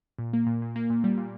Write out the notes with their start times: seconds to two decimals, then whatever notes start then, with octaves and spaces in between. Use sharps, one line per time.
0.19 A#2
0.33 A#3
0.46 A#2
0.62 A#2
0.76 A#3
0.90 A#2
1.04 G3
1.17 A#2